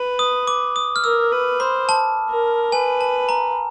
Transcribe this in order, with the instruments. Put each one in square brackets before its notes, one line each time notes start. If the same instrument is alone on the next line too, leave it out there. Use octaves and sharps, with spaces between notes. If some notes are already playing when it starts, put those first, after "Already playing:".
Already playing: [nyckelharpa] B4
[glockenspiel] D#6
D6
D#6
F6
[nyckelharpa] A#4 [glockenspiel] E6
[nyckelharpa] B4
[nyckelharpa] C5 [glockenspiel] B5
[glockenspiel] A5
[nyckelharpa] A#4
[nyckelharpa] B4 [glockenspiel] G#5
[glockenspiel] A5
A#5